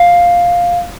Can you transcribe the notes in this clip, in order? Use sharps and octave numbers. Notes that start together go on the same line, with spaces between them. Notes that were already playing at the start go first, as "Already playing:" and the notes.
Already playing: F5